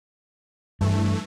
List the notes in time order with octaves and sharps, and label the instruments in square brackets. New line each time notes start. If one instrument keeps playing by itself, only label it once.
[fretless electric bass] G2 [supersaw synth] E3 A3